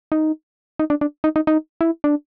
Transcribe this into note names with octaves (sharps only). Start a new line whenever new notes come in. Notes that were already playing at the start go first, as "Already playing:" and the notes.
D#4
D#4
D4
D4
D#4
D#4
D#4
E4
D4